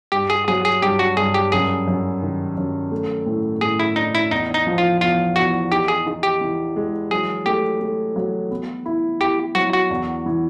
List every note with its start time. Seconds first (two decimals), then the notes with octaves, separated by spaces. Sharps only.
0.12 G2 G4
0.30 G#4
0.48 F#3 G#4
0.65 G#4
0.82 G2 G4
0.99 F#4
1.17 G2 G#4
1.34 G4
1.52 F#2 G#4
1.87 F#2
2.22 D#3
2.57 F#2
2.92 A3
3.26 A2
3.61 A2 G#4
3.79 E4
3.96 D4 D#4
4.15 E4
4.31 E2 D#4
4.54 D#4
4.67 F3
4.78 F4
5.01 E2 F4
5.36 E2 F#4
5.71 D#4 G4
5.88 G#4
6.06 D#4
6.23 G4
6.41 E3
6.76 G#3
7.11 F#3 G#4
7.46 A3 G4
7.81 A3
8.16 F#3
8.51 B3
8.86 E4
9.21 E4 G4
9.55 F#3 F#4
9.73 F#4
9.90 E2
10.26 E3